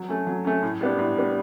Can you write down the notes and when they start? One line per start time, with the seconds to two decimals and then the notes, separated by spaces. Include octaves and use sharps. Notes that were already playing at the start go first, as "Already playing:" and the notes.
Already playing: F#3
0.09 A3 C#4
0.27 F#3
0.45 A3 C#4
0.63 A2
0.81 G3 B3 D4
0.99 A2
1.17 G3 B3 D4